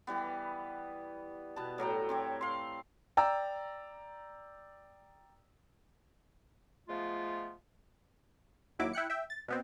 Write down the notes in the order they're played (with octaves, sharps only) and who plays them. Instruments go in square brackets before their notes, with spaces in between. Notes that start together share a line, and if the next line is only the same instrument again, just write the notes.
[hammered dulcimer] E3 G3 B3
B2 B3 A5
A2 F#3 G5 A#5
C4 G4 C#5
F5 C6
[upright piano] D5 G5 A#5 E6
[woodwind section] F3 G#3 A3 B3 F4
[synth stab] D#2 F#3 E4 D6
E4 G5 F#6 C#7
E5 G5
A6
B2 B3 C4